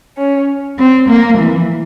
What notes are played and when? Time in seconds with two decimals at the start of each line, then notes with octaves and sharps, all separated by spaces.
0.18 C#4
0.78 C4
1.08 A#3
1.38 E3